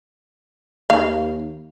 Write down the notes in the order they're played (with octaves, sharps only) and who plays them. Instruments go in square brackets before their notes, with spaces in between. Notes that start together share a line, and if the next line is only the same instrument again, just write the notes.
[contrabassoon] D#2 [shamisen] F5